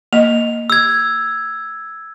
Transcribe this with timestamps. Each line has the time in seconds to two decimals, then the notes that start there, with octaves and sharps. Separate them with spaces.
0.13 A#3 D#5 F7
0.70 E6 G#6